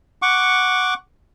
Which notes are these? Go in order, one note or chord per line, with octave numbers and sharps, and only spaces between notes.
F#5 C#6 D6